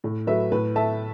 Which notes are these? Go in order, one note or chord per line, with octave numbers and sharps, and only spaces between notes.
A2
F#3 A3 B4 E5
A2 B4
A3 E5 A5